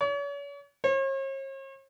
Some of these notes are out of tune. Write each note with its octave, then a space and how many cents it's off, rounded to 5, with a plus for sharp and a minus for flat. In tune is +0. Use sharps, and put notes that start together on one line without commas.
C#5 +40
C#5 -45